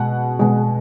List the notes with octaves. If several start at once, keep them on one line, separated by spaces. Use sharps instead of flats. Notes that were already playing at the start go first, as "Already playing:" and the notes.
Already playing: B2 G#3 F#5
B2 G#3